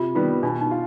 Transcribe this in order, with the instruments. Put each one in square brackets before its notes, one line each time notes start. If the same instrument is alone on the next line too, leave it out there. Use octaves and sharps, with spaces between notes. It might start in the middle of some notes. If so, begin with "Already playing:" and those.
Already playing: [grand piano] C3 [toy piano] F4
[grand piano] D#3 G3 B3
[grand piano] B2 [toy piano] D4
[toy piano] D#4
[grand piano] F4